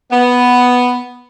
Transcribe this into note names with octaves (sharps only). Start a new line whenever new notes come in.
B3